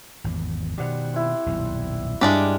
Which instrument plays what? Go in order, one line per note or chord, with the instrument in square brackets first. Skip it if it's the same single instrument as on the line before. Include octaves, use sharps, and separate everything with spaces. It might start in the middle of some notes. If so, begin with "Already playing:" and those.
[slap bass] G#1 E2
[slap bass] B2 D#3 [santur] G3 C5 F#5
[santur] C4 E4
[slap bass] D#1 B1 F2
[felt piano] G2 [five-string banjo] G#3 D4 G4 [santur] E4 F5 F#5